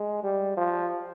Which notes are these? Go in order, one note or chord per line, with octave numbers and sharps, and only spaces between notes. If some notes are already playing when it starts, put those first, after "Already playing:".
Already playing: G#3
G3
F3